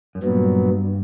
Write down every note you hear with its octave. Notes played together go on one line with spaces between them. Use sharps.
F#2
G2 A#2 F#3 B3